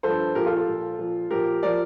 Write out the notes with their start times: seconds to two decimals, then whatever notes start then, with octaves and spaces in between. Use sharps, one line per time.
0.03 G2 F3 A4 C5
0.35 A#2 F3 G4 A#4
0.46 F4 A4
0.56 F4 A4
0.68 A#2 F3
0.99 A#2 F3
1.30 A#2 F3 G4 A#4
1.63 F3 A#4 D5